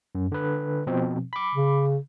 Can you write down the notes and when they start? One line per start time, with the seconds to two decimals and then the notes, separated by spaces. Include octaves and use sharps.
0.15 F#2
0.32 D3 B4
0.87 B2 F3 C4
1.33 B5 D6
1.55 C#3